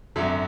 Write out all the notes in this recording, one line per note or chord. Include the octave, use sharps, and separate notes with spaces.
G#1 F#2 D3 F#3 E5